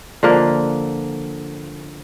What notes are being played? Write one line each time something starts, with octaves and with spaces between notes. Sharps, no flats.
D3 F3 A#3